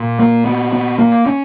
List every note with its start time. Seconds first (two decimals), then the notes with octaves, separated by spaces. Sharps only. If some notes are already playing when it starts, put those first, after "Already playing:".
Already playing: A#2
0.19 A#3
0.46 B3
0.73 B3
0.99 A#3
1.26 C#4